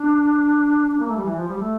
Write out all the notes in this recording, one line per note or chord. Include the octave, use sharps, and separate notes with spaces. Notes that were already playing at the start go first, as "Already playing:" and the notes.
Already playing: D4
D4
A#3
A3
G3
E3
F3
G3
A3